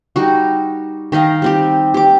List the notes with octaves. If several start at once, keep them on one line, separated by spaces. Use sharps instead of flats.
G3 D#4 F#4
D#3 D#4 D#5 F5
G3 C4 G4
G4 D6